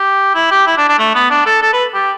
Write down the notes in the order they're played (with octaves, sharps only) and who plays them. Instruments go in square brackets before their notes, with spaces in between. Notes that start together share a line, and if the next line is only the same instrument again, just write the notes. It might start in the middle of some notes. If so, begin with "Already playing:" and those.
Already playing: [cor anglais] G4
E4
G4
E4
D4
D4
A3
B3
D4
A4
A4
B4
G4